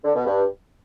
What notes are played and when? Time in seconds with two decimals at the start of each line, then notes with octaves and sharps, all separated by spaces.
0.04 D3
0.15 B2
0.26 G2